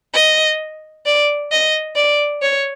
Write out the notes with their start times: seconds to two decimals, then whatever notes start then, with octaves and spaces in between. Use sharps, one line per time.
0.14 D#5
1.05 D5
1.51 D#5
1.96 D5
2.42 C#5